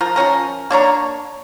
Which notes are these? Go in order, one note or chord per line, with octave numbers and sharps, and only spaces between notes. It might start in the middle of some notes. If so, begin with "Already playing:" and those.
F3 A#4
F3 F#3 C#4 A#4
A#3 D4 C#5 A#5